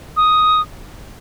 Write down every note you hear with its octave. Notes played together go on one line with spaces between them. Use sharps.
D#6